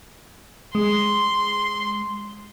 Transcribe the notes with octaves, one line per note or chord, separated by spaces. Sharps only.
G#3 C6